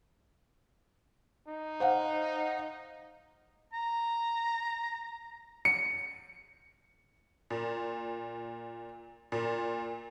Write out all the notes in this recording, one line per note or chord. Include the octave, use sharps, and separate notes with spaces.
D#4
C5 F5 F#5
A#5
C#7
A#2
A#2